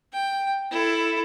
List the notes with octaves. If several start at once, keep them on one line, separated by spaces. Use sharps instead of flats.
G5
E4 A4